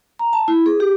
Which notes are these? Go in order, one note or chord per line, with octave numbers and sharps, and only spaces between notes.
A#5
A5
E4
G#4
G4